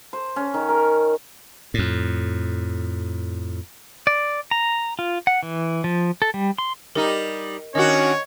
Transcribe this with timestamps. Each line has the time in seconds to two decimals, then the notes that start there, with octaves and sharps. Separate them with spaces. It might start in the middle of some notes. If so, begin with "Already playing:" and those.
0.13 C5
0.36 C#4
0.54 D#3
0.69 A#4
1.74 F2 A2
4.07 D5
4.51 A#5
4.99 F4
5.27 F#5
5.43 E3
5.84 F3
6.22 A4
6.34 G3
6.58 C6
6.95 G3 D#4 A#4 D#5
7.75 D#3 C#4 D4 F#4 C#5 D#5 F#5